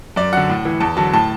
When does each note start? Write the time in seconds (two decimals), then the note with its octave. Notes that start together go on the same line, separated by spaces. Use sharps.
0.16 F#2 D5
0.33 D3 F#3 F#5
0.49 A2
0.65 E3
0.80 E2 A5
0.97 D3 F#3 A5
1.13 A2 A5